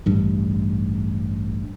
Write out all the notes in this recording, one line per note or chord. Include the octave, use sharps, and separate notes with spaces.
A1 G2